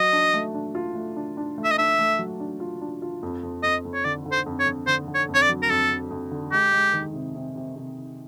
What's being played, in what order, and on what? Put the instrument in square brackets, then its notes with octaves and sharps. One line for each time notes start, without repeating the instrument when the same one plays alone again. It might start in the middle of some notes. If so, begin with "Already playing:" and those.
Already playing: [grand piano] F#3 [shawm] D#5
[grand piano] D4
A3
D4
F4
A3
D4
D4
A3
[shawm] E5
D#5
[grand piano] D4 [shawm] E5
[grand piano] A3
F#3
D4
F4
D4
F4
F2
F2
[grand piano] F2 [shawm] D#5
[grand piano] F2
[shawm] C#5
[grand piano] D3 [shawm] D5
[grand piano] D3
[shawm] C5
[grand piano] F2
[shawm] C#5
[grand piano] F2
[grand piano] D3 [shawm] C5
[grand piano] D3
[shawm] C#5
[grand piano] F2
[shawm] C#5
D5
[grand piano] F#3
[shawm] A#4
[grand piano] F2 [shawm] A4
[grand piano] F2
F2
D3
[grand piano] G#3 [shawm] G4
[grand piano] G#3
D#3
C3
C3
C3
C3